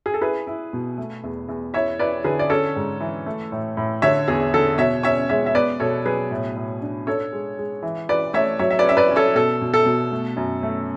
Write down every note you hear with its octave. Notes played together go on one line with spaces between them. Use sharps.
G#4
A4
E4 G#4 B4
E4
B2
A3
E2
E2
E4 C#5 E5
E4 B4 D5
D3 G#4 B4
D5
C#4 A4 C#5
G#2
E3
A3
A2
A2
D3 C#5 E5
E2 G#4
D3 A4
B2 C#5 E5
C#4 C#5 E5
G#3 C#5 E5
E5
B3 B4 D5
B2 A4 C#5
F#3 G#4 B4
A2
A2
D4
D4 A4 C#5
G#3
G#3
E3
E3 B4 D5
A3 C#5 E5
F#3 C#5 E5
E5
B4 D5
C#4 E5
B4 D5
C#4
A4 C#5
B2 A4
B2
A4
B2
A3
F#2
A3